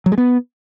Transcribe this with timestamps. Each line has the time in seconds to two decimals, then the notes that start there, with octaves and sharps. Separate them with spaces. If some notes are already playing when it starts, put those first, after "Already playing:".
0.06 F#3
0.12 G#3
0.18 B3